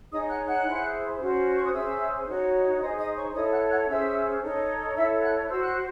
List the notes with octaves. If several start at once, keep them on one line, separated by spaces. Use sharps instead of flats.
D#4 G#4 C#5 D#5 D#6
F#5 F#6
F#5 F#6
E4 G#4 C5
C#4 F#4 C5
C6
C#6
D#6
C#4 G#4 C5 E5 E6
D#4 F#4 C#5
D#4 G#4 C5 D#5 D#6
D#5 D#6
C#5 C#6
E4 A4 C#5 D#5 D#6
F#5 F#6
F#5 F#6
C#4 G#4 C5 E5 E6
D#4 A4 C#5
E4 A4 C#5 E5 E6
F#5 F#6
F#4 C5 E6
F#6